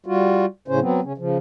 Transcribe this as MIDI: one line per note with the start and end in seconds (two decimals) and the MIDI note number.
0.06 0.45 55
0.06 0.45 65
0.06 0.45 66
0.68 0.80 45
0.68 0.80 49
0.68 0.80 61
0.68 0.80 72
0.81 1.00 54
0.81 1.00 59
0.81 1.00 60
1.04 1.13 49
1.04 1.13 61
1.18 1.38 49
1.18 1.38 53